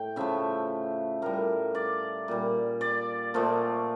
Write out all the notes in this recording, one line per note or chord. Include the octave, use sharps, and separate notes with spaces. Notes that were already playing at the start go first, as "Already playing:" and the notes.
Already playing: A2 G5
C#3 F3 A3 E5
A2 G3 A#4
D5
A#2 G3
D5
A#2 F3 A3